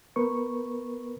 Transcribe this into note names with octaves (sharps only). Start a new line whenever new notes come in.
B3 A#4 B4 C#6